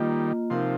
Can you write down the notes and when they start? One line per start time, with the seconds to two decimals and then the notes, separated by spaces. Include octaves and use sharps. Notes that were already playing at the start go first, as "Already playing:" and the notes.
Already playing: D#3 G3 A#3 F4 D#5
0.50 C3 F3 D#4 A#4 F5